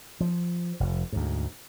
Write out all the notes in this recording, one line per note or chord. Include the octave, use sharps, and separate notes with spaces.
F3
F1
D2 G#2